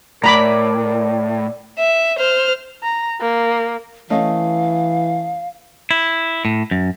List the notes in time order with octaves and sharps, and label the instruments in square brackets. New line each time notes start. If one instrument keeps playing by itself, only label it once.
[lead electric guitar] A2 [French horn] A#4 [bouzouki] D5 [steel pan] A#5 B5 D6
[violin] E5
C5 F6
[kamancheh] A#5
A#3
[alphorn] E3 [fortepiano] A3 C#4 D#5 [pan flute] F5
[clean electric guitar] E4
A2
F#2